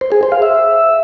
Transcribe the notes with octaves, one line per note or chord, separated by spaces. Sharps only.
C5
G#4
C5
F5
E5